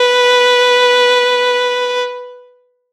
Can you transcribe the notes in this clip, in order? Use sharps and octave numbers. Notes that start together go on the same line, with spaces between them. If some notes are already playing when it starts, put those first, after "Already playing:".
Already playing: B4